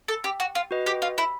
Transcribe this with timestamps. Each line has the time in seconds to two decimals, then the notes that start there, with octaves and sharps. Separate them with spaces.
0.08 A4
0.24 G4
0.40 F#4
0.55 F4
0.71 F#4 B4 D#5
0.86 G4
1.02 F4
1.18 E4